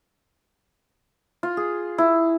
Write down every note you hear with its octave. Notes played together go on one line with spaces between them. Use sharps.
F4
G#4
E4